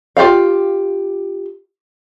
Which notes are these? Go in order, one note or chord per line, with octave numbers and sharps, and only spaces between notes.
F4 G4 D5 F5